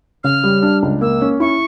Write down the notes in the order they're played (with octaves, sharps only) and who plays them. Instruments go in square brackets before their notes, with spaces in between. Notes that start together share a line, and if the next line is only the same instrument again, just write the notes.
[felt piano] C#3 [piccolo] F6
[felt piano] G3
D4
C#2
[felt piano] A#3 [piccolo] E6
[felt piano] C#4
[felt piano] E4 [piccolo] C#6